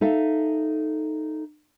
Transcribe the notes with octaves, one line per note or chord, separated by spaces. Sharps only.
D#4 A4 E5 F5